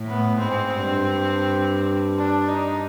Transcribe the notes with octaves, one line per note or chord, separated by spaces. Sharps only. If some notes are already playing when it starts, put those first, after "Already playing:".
Already playing: A2
B3
G#2 C4
G2
D4
D#4